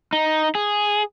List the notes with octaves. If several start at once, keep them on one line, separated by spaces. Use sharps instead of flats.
D#4
G#4